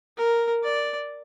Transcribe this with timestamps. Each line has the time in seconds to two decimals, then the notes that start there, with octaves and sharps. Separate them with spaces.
0.17 A#4
0.64 D5